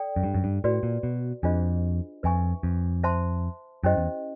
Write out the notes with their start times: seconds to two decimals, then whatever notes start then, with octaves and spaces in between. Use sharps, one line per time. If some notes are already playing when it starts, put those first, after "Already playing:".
Already playing: A4 D5 G5
0.16 F#2
0.23 G2
0.34 F#2
0.44 G2
0.64 A2 F#4 B4 D5
0.83 A#2
1.03 B2
1.43 F2 D4 F4 G#4 C5 D#5
2.23 F2 B4 E5 G#5 C#6
2.63 F2
3.04 C5 E5 A5 C6
3.84 F#2 C#4 E4 G4 C5 D#5
3.97 E2